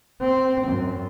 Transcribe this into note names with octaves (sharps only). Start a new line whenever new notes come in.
C4
F#2